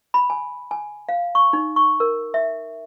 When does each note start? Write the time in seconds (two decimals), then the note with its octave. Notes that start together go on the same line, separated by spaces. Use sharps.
0.14 B5
0.30 G#5
0.71 G#5
1.09 F5
1.35 C#6
1.53 D#4
1.76 C#6
2.00 A#4
2.34 E5